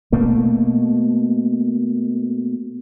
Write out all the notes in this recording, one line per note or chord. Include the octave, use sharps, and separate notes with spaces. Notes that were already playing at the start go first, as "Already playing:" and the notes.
B2 A3 A#3